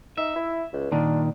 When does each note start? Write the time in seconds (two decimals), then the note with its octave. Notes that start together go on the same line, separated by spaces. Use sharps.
0.17 D#4 E5
0.36 E4
0.73 C#2
0.92 A#2 D#3 D4